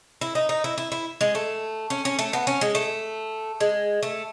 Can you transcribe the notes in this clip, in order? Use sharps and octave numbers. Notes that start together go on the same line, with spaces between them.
E4
D#4
D#4
E4
E4
E4
G#3
A3
C#4
C#4
A3
B3
C#4
G#3
A3
G#3
A3